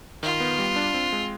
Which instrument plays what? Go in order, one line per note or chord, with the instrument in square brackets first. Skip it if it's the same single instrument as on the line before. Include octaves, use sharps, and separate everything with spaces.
[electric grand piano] D#3 [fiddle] F4
[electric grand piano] B3
G3
D4
C4
G#3